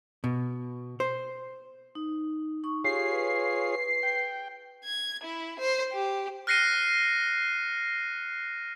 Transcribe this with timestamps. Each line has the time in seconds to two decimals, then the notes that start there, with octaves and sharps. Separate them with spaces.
0.24 B2
1.00 C5
1.95 D#4
2.64 D#4 C#6
2.84 F4 G4 G#4 C#5 C7
3.11 B4
4.03 G5
4.84 G#6
5.24 E4
5.59 C5
5.93 G4
6.47 F6 F#6 A#6 C7 C#7 D#7